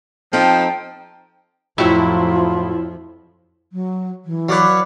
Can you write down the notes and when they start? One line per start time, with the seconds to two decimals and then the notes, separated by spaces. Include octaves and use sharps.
0.33 F3 C4 D#4 A4 G5
1.78 F2 A2 F3 F#3 E4 F4
3.72 F#3
4.25 E3
4.49 F#3 B4 C#5 D5 F5